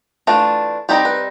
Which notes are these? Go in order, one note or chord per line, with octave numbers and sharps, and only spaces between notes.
E3 A3 D4 F4
G3 C4 D#4 G4
B4